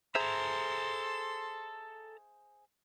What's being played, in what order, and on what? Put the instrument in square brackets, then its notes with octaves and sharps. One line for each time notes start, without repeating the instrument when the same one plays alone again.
[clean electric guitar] G#4 C5 E5 [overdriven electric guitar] A4 A#5 [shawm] C6